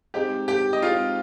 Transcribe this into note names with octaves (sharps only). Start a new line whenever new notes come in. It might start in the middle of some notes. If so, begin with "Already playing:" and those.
G#3 C4 D#4 G4 G5
G4 G5
D#5
G#3 C4 D#4 F4 F5